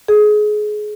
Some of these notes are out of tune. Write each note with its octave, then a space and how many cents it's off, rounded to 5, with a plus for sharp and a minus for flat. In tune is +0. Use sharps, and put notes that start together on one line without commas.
G#4 +25